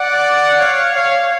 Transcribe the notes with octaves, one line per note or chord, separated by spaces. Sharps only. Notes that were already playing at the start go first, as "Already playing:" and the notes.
Already playing: D5 F#5
C#5 F5
C#5 F5